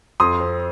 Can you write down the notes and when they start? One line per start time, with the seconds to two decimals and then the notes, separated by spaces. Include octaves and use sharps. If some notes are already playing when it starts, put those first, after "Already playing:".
0.20 F2 C6 D#6
0.40 C4